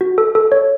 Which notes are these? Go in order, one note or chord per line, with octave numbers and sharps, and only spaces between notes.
F#4
A4
A4
C#5